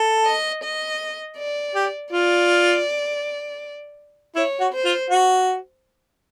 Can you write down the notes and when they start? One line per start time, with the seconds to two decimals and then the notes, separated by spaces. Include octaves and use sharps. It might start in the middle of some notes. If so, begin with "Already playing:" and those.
Already playing: A4
0.26 D#5
0.64 D#5
1.37 D5
1.75 G4
2.12 F4 D5
4.36 E4 C#5
4.60 F#4
4.72 C5
4.85 F4
5.10 F#4